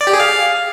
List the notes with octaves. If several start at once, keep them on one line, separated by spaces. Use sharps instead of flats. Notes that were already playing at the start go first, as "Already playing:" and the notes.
D5
G4
G#4
F5